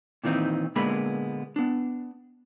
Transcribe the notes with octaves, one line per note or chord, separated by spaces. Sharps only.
A#2 D#3 E3 C4 D#4
A#2 D3 G#3 A#3 B3 B5
B3 D4